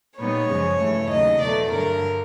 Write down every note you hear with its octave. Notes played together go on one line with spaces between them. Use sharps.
A#2 G3 B3 D#4 C#5
F#2 C#3 F3 G#3 C#4
G2 E3 A3
D#2 C#3 F#3 D#5
E2 B2 F#3 A3 D5
G2 D3 F#3 A#4